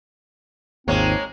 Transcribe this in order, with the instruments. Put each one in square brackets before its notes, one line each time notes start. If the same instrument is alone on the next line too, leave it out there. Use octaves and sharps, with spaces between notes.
[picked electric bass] G#1 D#2 [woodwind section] F3 C4 D#4 [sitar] G#3 A#3 C#5